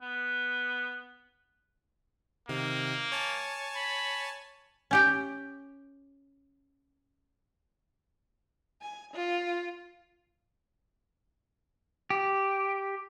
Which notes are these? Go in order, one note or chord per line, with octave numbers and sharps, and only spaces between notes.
B3
C3 D#3 A#3
C#5 G#5 A5
B5
C#4 G4 G5
G#5
F4
G4